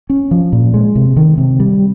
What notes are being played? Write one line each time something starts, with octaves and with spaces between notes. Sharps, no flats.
C#4
F3
A#2
G#3
C3
D#3
C3
G3